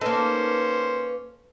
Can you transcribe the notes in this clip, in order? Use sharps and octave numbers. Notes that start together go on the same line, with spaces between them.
A#3 C#4 D#4 A4 B4 C5